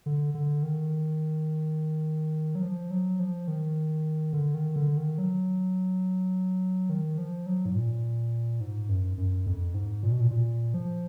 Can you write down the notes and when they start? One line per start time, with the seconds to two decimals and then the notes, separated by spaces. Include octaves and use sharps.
0.06 D3
0.34 D3
0.63 D#3
2.55 F#3
2.63 F3
2.91 F#3
3.20 F3
3.48 D#3
4.33 D3
4.54 D#3
4.76 D3
4.97 D#3
5.18 F#3
6.89 D#3
7.18 F3
7.46 F#3
7.66 G#2
7.75 A#2
8.61 G#2
8.89 F#2
9.18 F#2
9.46 F2
9.74 G#2
10.03 A#2
10.12 B2
10.21 A#2
10.31 A#2
10.74 F3